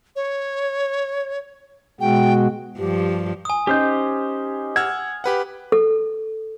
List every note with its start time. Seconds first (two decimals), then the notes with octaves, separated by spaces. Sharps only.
0.16 C#5
2.01 B2 G#3 F#4 G5
2.78 G2 F3 G4
3.45 G#5 D#6
3.67 C#4 D#4 G4 C5 G6
4.76 F#5 E6 F6 G#6
5.24 G4 B4 F#5
5.72 A4